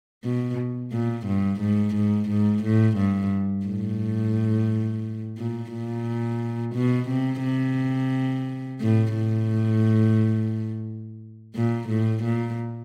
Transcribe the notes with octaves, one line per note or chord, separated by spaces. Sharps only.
B2
A#2
G2
G#2
G#2
G#2
A2
G2
A2
A#2
A#2
B2
C3
C3
A2
A2
A#2
A2
A#2